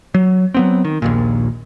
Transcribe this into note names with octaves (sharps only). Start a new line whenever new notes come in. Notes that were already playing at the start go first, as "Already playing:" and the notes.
F#3
F#3 B3 C4
D#3
A#1 D#2 A#2